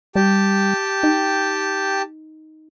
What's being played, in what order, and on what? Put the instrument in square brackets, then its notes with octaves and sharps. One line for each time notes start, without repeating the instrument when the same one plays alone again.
[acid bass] G3 [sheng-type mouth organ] G4 G5 A5
[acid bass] D#4